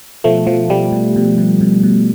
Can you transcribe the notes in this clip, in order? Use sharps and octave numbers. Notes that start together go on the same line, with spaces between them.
B2 F3 A3
B2 F3
B2 G3
B2
B2
B2
B2
B2